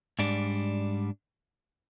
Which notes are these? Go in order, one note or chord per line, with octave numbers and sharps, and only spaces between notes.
G#2 G3 D4